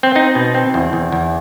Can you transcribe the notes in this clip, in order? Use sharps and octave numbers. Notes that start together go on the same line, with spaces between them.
C4
C4 D#4
B2
C4
E2
E2
E2